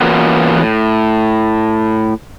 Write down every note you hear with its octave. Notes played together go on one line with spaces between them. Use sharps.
E3 A#3 B3 C#4 F4 F#4
A2